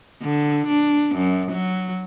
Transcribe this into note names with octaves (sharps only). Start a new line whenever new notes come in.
D3
D4
F#2
F#3